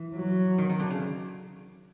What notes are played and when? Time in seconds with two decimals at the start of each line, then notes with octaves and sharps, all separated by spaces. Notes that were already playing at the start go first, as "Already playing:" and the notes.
Already playing: E3
0.15 F#3
0.58 D#3
0.69 D#3
0.80 D3
0.90 C#3